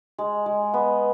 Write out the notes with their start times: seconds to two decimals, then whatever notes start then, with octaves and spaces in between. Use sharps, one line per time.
0.18 G#3
0.46 G#3
0.74 B3